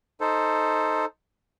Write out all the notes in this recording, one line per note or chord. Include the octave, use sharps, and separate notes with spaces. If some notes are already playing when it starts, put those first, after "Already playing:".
D#4 A4 C5